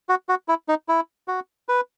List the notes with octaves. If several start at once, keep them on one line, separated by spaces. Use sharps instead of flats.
F#4
F#4
E4
D#4
E4
F#4
B4